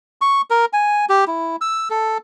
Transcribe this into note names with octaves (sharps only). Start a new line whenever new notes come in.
C#6
A#4
G#5
G4
E4
E6
A4